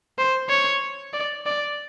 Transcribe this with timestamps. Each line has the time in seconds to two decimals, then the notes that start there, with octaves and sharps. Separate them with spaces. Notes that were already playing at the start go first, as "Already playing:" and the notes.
0.18 C5
0.49 C#5
1.13 D5
1.46 D5